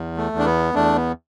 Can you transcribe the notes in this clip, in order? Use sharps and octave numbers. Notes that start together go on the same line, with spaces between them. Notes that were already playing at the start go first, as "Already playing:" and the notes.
Already playing: E2
A3
E2
D4
B3
E2 A3 D4
B3